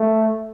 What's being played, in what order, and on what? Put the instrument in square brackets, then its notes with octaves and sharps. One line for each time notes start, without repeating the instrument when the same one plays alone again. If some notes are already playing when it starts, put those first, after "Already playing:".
Already playing: [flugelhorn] A3